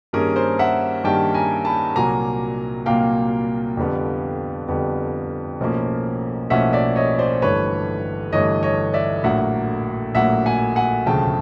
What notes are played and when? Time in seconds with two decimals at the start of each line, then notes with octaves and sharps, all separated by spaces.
0.13 G2 D#3 G3 A#3 C#4 G#4 A#4
0.36 A#4 C5
0.59 E5 F#5
1.04 G2 D#3 G3 A#3 C#4 G5 A5
1.34 G#5 A#5
1.65 A5 B5
1.95 C2 A#2 F#3 A#3 G#5 A#5
2.86 C2 A#2 F#3 A#3 F5 G5
3.77 F2 D3 G3 B3
4.68 F2 D3 G3 B3
5.60 B1 A2 F3 A#3 C#4
6.50 B1 A2 F3 A#3 C#4 E5 F#5
6.73 D5 E5
6.96 C#5 D#5
7.19 C5 D5
7.42 G1 G2 E3 A3 B4 C#5
8.32 G1 G2 E3 A3 C#5 D#5
8.63 C#5 D#5
8.94 D5 E5
9.24 A#1 A2 F#3 A#3 E5 F#5
10.15 A#1 A2 F#3 A#3 E5 F#5
10.46 F#5 G#5
10.76 F#5 G#5
11.06 E1 D2 C#3 F3 A3 G5 A5